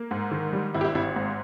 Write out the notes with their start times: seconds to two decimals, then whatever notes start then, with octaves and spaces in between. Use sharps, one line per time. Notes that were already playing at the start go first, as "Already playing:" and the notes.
Already playing: A#3
0.11 G#2
0.31 D#3
0.53 G3
0.74 G#1 E4
0.81 G4
0.85 E4
0.95 G#1 E4
1.16 G#2